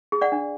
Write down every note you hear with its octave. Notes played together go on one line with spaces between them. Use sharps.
G#4
D5 F#5
D4